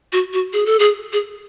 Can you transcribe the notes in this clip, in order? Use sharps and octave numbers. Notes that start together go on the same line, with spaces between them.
F#4
F#4
G#4
A4
G#4
G#4